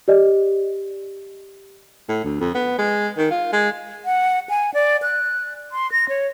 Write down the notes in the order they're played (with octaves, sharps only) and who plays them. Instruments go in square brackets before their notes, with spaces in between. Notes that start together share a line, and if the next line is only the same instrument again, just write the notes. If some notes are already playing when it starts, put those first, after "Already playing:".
[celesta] G4 D5 D#5
[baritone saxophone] A2
D2
F2
B3
G#3
D#3
F4
G#3
[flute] F#5
G#5
D5
F#6
C6
A#6
C#5